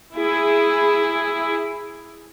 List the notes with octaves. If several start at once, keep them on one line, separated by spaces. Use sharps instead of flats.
E4 G#4